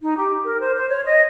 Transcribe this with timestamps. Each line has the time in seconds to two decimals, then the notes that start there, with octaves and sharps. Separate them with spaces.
0.01 D#4
0.16 G4
0.44 A#4
0.60 C5
0.75 C5
0.89 C#5
1.04 D#5